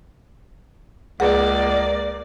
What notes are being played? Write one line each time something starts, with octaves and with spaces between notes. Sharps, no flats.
C#2 A#3 G#4 D5 F#5